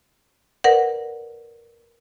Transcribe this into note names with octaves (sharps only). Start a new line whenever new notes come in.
A#4 B4 D5 F#5